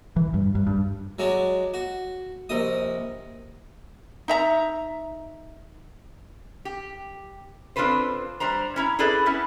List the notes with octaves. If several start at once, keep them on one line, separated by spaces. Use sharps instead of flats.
E3
G2
G2
G2
F#3 G#3 D4
F#4
A#1 C3 D#5 D#6
D#4 E5 A#5
G4
C4 D4 F4 A4 B4 C5
G3 D4 C5 A#5
C#4 E4 A#5
E4 G#4 A4 B4 D5
B3 C#4 E4